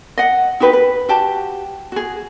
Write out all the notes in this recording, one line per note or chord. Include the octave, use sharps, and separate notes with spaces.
D#5 F#5
D#4 F#4 G4 B4
B4
F#4 G4 A5
F#4 G#4